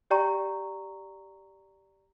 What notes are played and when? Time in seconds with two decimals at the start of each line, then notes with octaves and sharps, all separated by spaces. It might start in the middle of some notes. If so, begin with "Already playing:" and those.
0.10 G4 D5 G5 A#5 C#6